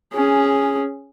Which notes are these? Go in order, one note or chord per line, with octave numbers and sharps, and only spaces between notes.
C#4 G#4